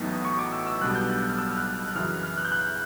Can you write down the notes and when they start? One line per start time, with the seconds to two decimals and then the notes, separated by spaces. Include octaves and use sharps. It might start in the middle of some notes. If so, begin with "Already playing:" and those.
Already playing: A1 A2 F#3 B3 D#4
0.25 C#6
0.39 D6
0.52 E6
0.67 E6
0.81 B1 B2 G3 B3 D4 F#6
0.95 G6
1.10 F#6
1.29 F6
1.39 E6
1.48 F6
1.57 F#6
1.88 F#6
1.95 F#2 C#3 E3 F6
2.23 F6
2.37 F#6
2.45 G6
2.52 F#6